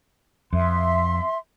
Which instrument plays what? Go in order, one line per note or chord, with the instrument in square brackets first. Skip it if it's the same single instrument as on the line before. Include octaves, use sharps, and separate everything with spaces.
[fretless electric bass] F2 [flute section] E5 C6